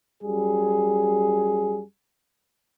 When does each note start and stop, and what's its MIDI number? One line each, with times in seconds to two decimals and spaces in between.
0.23 1.81 42
0.23 1.81 55
0.23 1.81 68